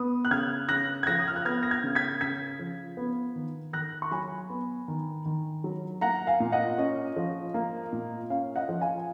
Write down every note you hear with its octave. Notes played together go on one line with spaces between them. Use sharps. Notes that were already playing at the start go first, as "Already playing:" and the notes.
Already playing: B3 D#6
F#6
C#3 F6 G#6
C#3 F#6 A#6
G#6
F3 F#6 A#6
D#6
F6
F#6
B3 F6 G#6
A#6
F6 G#6
C#3
G#6 B6
C#3 G#6 B6
F3
B3
D#3
D#3 F#6 A#6
C#6
F#3 G#5 B5
B3
D#3
D#3
F#3
A#3 F#5 A#5
F5 G#5
A#2
D#5 F#5
C#4 D#5
F3
A#3
A#2
C#4 F5
D#5 F#5
F3
F5 G#5